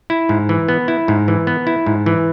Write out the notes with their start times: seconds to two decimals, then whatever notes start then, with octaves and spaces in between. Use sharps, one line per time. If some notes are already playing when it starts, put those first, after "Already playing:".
0.10 E4
0.29 G#2
0.49 E3
0.68 B3
0.88 E4
1.08 G#2
1.28 E3
1.47 B3
1.67 E4
1.86 G#2
2.06 E3